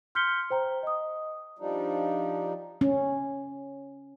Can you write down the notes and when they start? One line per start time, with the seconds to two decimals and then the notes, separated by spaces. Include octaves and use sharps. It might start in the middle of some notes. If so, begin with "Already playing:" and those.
0.15 C6 F6 G6 B6 C#7 G7
0.50 C5 G5 A#5
0.83 D#5 D#6
1.59 F3 G3 D4 D#4
2.81 C#4